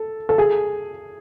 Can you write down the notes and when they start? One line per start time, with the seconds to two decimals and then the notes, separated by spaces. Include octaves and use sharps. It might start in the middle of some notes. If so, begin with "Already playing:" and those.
Already playing: A4
0.29 A4
0.38 G#4